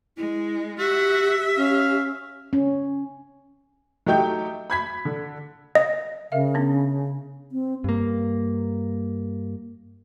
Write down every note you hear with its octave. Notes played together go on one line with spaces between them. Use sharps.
G#3 E4
F#4 G4 E5
C#4 F5
C#4
F#3 A3 D#4 G4 G5 G6
B5 G#6 B6
D3
D#5
C#3 A#4 E5 F5
B3 C#4 D4
C4
G2 A#3